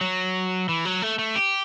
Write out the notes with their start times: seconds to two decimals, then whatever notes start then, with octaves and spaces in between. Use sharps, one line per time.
0.01 F#3
0.69 E3
0.85 F#3
1.02 A3
1.19 A3
1.36 G4